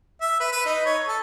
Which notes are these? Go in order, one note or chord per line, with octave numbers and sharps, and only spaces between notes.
E5
B4
B4
D#4
C#5
A4